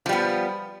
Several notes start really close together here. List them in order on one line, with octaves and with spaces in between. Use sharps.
F3 G3 B3